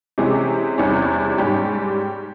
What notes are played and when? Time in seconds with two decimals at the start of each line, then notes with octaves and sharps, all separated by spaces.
0.18 C3 E3 G#3 C#4 G4
0.78 E2 C3 G3 C#4
1.38 G#2 G3 C#4 G4